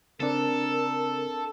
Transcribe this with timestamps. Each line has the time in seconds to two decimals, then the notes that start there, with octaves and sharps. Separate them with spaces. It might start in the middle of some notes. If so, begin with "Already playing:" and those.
0.20 C#3 C4 D4 A4 A#4